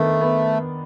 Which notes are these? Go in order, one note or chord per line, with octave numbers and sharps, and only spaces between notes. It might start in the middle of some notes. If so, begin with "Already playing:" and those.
Already playing: D#3 A3 B3 D4
B3